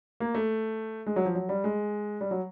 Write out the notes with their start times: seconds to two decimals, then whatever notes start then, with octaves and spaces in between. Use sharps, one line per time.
0.20 A#3
0.35 A3
1.07 G#3
1.16 F#3
1.25 F3
1.35 F#3
1.49 G3
1.64 G#3
2.21 G3
2.31 F#3